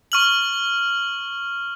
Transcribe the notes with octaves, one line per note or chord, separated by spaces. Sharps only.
C#6 F6 F#7